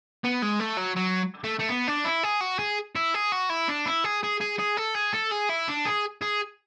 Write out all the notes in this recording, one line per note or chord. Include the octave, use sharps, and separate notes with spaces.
B3
G#3
A3
F#3
F#3
A3
A3
B3
D4
E4
G#4
F#4
G#4
E4
G#4
F#4
E4
D4
E4
G#4
G#4
G#4
G#4
A4
G#4
A4
G#4
E4
D4
G#4
G#4